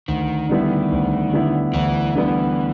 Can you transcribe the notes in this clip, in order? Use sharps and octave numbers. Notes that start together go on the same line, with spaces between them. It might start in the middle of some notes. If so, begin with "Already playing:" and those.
D2 D#3
D3 G3 B3 E4
D2
D3 G3 B3 E4
D2 E3
D3 G3 B3 E4